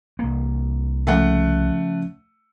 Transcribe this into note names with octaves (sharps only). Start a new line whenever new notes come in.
C2 A#3
C#3 F3 A3 C#4 F#5